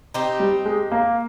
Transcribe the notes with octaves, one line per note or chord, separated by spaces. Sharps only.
C4 D#4 G4
G3
G#3
A#3